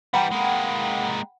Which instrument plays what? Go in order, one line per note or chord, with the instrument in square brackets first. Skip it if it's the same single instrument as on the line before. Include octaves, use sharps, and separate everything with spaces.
[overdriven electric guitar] E3 G3 [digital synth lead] F#5 [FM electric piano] G5 A#5 B5
[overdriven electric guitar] G#3 A#3